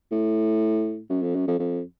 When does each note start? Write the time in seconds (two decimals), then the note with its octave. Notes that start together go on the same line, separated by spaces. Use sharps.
0.12 A2
1.10 F#2
1.22 F2
1.35 F#2
1.48 F2
1.59 F2